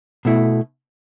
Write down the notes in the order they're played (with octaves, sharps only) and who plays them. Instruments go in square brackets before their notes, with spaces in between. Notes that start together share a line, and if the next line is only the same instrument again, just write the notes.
[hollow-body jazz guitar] B2 A3 E4